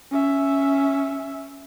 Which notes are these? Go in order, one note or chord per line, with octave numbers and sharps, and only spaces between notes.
C#4 E5